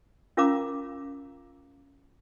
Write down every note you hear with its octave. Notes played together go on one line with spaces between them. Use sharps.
C#4 F4 A#4 F5 A#5 D6